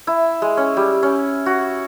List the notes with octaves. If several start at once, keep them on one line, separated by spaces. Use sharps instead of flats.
E4
G#3
C#4
G3
C#4
F#4